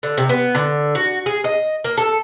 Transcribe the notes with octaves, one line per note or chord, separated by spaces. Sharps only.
D3
C3
B3
D3
F#4
G#4
D#5
A#3
A4